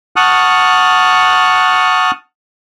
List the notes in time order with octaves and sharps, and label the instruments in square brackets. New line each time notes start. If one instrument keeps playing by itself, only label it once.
[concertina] F#5 A5 C#6 D#6 F6 F#6